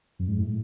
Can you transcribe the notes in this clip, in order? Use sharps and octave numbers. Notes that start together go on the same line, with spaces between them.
F#2
G#2
A2